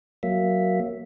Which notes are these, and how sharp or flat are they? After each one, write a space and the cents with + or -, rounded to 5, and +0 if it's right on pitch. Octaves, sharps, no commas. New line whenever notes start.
F#3 +0 A#3 +0 E5 +0